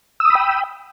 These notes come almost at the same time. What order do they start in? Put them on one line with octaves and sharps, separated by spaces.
E6 D#6 B5 G5